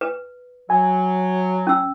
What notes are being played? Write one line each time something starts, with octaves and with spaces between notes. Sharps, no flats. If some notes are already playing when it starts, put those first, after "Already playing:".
B4
F#3 G#5
C#4 E6